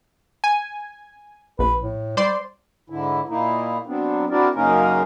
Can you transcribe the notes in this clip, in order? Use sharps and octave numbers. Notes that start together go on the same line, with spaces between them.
G#5
A#1 B4
A2
G3 C5 D5 C6
G#2 D3 E4
A#2 A#3 D#4 E4
F#3 B3 C4 D4
C4 D4 E4 F#4 A#4 D5
F#2 C#3 A#3 C#4 D#4 A#4